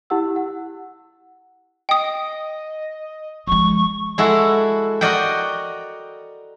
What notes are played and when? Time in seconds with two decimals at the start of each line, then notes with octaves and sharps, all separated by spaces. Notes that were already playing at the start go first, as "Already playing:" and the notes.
0.10 E4 G4 F#5 E6
0.36 F#5
1.89 D#5 G5 D#6
3.47 F3 G#3 C#6
4.18 G#3 E4 F#4 A4
5.01 F#4 A#4 D5 D#5 F#5 G5